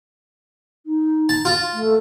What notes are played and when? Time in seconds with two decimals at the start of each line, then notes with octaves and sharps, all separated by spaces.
0.86 D#4
1.29 A5
1.45 F4
1.74 A3